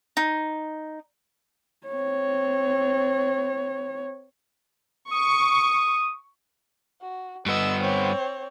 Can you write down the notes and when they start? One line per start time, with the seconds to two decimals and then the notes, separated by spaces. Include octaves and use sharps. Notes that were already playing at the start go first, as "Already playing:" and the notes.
0.17 D#4
1.87 C4 C#5
5.12 C#6 D#6
7.01 F#4
7.46 G2 B3 D#5 E6
7.81 C4 C#5